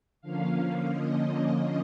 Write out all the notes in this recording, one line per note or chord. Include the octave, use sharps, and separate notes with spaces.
D3 F3 A#3 C#4 F5
D#5